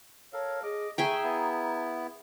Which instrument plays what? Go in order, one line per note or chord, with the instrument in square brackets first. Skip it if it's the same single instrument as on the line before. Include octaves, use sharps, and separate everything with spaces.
[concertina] A4 A#4 F5 [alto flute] C#5
[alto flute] G#4 [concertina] D#5 D6
[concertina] A3 [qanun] G#4 E5 G5 [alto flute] A#5
[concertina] B3 E4